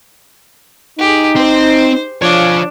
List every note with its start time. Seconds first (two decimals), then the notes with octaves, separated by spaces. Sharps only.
0.99 D#4 G4 G#4
1.36 C4 C5
2.22 F3 D4 C#5 F5